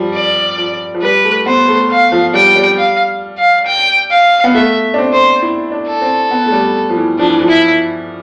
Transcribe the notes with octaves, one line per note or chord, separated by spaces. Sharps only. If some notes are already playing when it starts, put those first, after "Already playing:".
Already playing: F3 G3
D5
F3
F3
G3 B4
A3
B3 C5
A3
F5
F3
G3 G5
G3
F5
F5
G5
F5
B3
A3 E5
D4
C4
C5
E4
D4
A4
C4
B3
A3
G3
F3
E3
F3 D4
E3
F3
E4